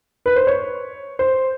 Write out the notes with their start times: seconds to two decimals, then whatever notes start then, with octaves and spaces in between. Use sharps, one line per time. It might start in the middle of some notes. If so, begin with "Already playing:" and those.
0.26 B4
0.36 C5
0.47 C#5
1.19 C5